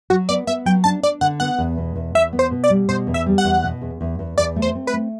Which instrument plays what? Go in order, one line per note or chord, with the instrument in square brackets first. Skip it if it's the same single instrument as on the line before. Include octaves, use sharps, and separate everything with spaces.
[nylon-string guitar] F#3 [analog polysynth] F#4
[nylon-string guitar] B3 [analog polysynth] D5
[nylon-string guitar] B3 [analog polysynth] E5
[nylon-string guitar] F#3 [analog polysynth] G5
[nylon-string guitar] D4 [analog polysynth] A5
[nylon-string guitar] D4 [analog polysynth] D5
[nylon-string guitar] D3 [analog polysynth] F#5
[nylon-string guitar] B3 [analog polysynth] F#5
[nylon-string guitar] E2
B2
E2
[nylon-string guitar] E2 [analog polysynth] E5
[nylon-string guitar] B3
[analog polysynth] C5
[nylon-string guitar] B2
[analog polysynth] D5
[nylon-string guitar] G3
[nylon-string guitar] B2 [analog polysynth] C5
[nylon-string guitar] E2
[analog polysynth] E5
[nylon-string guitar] G3
[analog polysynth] F#5
[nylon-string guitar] E2
B2
E2
E2
E2
[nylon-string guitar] E2 [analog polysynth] D5
[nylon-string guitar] A3
[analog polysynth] C5
[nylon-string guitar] C4
[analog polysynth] B4
[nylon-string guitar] A3